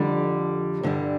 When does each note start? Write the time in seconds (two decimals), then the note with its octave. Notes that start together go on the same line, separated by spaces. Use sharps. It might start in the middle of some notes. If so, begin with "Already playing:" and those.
Already playing: F2 D3 G3
0.83 G2 D3 G3